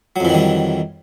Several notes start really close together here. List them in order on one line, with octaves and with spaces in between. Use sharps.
F#3 F2 E3 D#3 G3